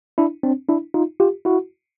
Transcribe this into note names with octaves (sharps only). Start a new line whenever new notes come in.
D4 E4
C4 D4
D4 E4
D#4 F4
F4 G4
E4 F#4